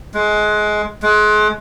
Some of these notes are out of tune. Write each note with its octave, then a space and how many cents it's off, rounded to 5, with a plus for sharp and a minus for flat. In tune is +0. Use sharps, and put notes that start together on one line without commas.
G#3 +20
G#3 +35